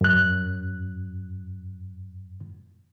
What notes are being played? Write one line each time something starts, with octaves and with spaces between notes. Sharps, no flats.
F#2 F#6